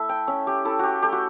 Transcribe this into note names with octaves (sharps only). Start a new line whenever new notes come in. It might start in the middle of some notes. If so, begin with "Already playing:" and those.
Already playing: A3 E4 E5 A5
G5
C#4 E5
G4
E4 A4
F#4 G4
A3 G4
F#4